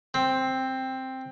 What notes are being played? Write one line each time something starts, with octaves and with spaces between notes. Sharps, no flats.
C4